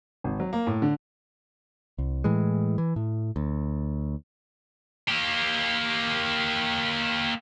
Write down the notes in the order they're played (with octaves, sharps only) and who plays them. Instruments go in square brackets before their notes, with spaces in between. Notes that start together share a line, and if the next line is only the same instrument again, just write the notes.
[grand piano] G#1
F#3
A#3
A2
D3
[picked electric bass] C2
A2 E3 G#3
E3
A2
D2
[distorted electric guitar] A#3 G4